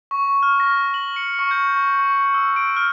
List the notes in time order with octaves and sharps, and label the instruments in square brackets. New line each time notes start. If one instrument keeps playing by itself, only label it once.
[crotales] C#6
F6
A#6
F#7
C#7
C#6
G6
C#6
C#6
E6
D7
F6